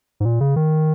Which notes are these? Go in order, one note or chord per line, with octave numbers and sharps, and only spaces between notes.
G#2
A#2
C#3
D#3